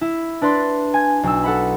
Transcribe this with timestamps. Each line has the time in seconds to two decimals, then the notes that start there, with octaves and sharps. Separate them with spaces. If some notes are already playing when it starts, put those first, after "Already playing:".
0.01 E4
0.41 D4 B4 D5 C6
0.94 G#5 G#6
1.23 B1 E6
1.43 A4 F#5 B5